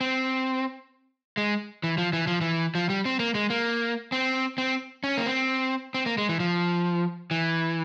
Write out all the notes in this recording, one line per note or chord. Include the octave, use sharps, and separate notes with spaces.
C4
G#3
E3
F3
E3
F3
E3
F3
G3
C4
A#3
G#3
A#3
C4
C4
C#4
A#3
C4
C4
A#3
G#3
E3
F3
E3